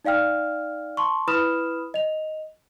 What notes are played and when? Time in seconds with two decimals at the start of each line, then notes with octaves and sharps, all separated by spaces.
0.05 D#4 D5 F5 G5 F6
0.97 A5 C6 C#6
1.28 E4 B4 B5 D#6 F6 E7
1.94 D#5 F7